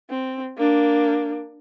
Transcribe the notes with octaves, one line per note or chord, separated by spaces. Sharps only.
C4
A#3 D4